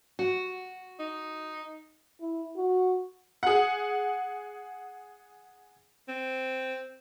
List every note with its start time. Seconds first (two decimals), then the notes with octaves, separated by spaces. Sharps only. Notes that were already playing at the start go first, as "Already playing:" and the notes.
0.19 F#4
1.00 D#4
2.21 E4
2.56 F#4
3.43 G#4 F#5
6.08 C4